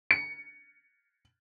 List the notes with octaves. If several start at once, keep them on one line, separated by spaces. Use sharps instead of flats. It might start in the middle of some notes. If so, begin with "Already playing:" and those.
C#7